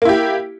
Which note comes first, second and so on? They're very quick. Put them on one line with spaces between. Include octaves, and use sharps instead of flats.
A#3 E4 G4